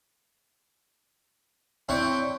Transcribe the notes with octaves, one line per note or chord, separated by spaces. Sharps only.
C4 D4 E4 C#5 G5 C#6